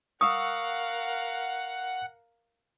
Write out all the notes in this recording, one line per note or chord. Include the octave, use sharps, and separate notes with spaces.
A#4 F5 F#5 C#6 D#6 E6